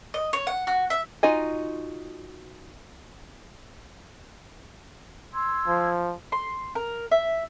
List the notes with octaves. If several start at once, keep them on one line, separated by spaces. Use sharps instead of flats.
D#5
C#5
F#5
F#4
E5
D#4 F4 F#4 D#5 G#5
C6 E6 G#6
F3
C6
A#4
E5